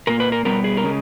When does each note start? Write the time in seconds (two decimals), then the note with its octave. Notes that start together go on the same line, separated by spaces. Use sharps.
0.07 A#2 A#3 A#4
0.20 B4
0.32 A#4
0.45 B2 G3 B3 A#4
0.64 G#4
0.77 A#4
0.84 C#3 G#3